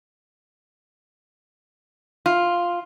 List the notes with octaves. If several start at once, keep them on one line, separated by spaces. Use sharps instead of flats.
F4